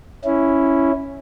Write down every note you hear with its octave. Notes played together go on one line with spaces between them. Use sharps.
C#4 E4